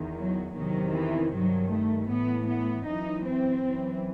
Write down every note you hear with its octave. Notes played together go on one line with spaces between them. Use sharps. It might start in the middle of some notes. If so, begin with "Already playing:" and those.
Already playing: E2 D#3
F#3
E2 C3 D#3 F#3
E3
G2 D#3 F#3
A3
A2 E3 B3
B3
F#2 E3 D#4
C4
F#2 E3